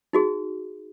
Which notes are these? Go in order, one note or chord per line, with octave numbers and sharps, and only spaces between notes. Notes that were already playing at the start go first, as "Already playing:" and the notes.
D#4 F#4 G#4